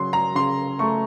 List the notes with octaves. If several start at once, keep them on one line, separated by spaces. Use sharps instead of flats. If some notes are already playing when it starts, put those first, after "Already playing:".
Already playing: C#3 F#3 C6
A#5
C#3 C6
A3 C#6